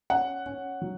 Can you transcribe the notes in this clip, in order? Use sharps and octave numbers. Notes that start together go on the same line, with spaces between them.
C#4 F#5
C#4
F#3